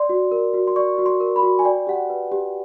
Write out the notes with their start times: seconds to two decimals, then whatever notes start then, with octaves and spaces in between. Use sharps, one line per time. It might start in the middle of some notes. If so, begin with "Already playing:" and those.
Already playing: D5 C6
0.09 F#4
0.31 A#4
0.54 F#4
0.67 C6
0.76 D5 C#6
0.98 F#4
1.06 C6
1.20 A#4
1.36 B5
1.43 F#4
1.59 G#5
1.65 D5 G5
1.87 G4 F#5
1.94 G5
2.10 B4
2.32 G4